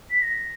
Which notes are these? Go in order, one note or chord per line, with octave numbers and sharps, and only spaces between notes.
B6
A#6